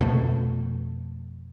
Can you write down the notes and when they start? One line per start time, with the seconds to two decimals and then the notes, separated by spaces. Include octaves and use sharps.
0.01 F2 B2 A3